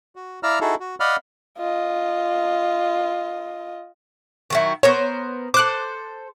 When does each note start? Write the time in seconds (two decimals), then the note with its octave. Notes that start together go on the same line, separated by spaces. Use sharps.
0.16 F#4
0.43 E4 D5 F5 A#5 E6 F6
0.61 D#4 E4 F#4 G#4 A4
0.80 F#4
1.00 D5 D#5 F5 F#5 B5 F6
1.58 F4 D#5
4.50 D#3 F#3 E4
4.83 B3 A#4 C5 C#5
5.54 A4 C5 D6 F#6